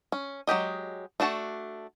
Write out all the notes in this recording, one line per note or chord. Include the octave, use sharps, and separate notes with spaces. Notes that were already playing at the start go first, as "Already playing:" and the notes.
C#4
F#3 G#3 G4 D#5
A3 D4 F#4 A5